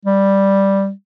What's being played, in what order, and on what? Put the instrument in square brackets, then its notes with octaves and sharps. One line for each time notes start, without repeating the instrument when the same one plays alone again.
[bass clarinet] G3